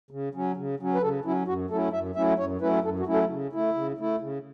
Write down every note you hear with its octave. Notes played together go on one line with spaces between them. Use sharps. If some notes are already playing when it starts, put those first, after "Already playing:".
C#3
F#3 C#4
C#3
F#3 C#4
B4
C#3 A4
F#3 C#4 E4
F#2 F#4
F#3 A3 C#4 E4 A4
F#2 E5
F#3 A3 C#4 E4 E5
F#2 C#5
F#3 A3 C#4 E4 B4
F#2 A4
F#4
F#3 A3 C#4 E4
A4
C#3
A3 E4
C#3
A3 E4
C#3